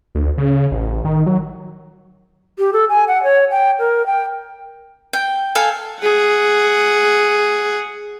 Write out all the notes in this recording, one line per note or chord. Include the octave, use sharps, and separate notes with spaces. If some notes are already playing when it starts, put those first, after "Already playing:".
D2
C#3
A1
D#3
F#3
G4
A4
G#5
F#5
C#5
G5
A#4
G5
G5
A4 F5 G#5
G#4 F#5